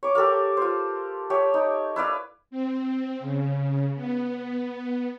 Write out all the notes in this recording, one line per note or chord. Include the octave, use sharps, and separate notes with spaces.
C#5 D6
G4 A4 A#4 F5
F4 C5
G4 C#5 E5
D#4
E4 B4 D5 F5
C4
C#3
B3